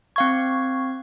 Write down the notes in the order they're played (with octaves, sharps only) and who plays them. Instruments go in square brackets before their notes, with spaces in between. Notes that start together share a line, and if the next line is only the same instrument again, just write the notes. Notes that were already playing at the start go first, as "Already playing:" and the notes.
[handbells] C4 F5 G#6 [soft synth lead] C#6